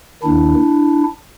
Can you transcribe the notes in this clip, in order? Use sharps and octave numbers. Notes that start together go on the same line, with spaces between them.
D#2 D#3 D4 E4